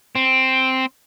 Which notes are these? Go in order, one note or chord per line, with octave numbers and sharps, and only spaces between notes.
C4